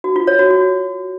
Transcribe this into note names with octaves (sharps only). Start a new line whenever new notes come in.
F#4
F4
C#5
F#4
F#4